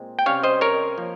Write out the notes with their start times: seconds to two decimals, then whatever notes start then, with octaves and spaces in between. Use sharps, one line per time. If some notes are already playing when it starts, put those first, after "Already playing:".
Already playing: A#2 G#3 C4
0.19 G5
0.26 C3 G3 C#4 C#5 F5
0.43 C5 D#5
0.61 A#4 C#5
0.98 F3 A#3